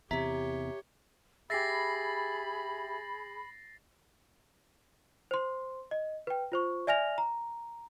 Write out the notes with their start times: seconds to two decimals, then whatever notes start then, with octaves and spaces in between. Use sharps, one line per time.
0.11 E2 C3 G4 C#5 E5 A#5 B6
1.50 G4 G#4 E5 B5 A6 A#6 C7
5.31 C5 C6
5.91 D#5
6.27 B4 G5
6.52 F4 C5 C#6
6.87 D5 E5 G#5 F6 A#6 F7
7.18 A#5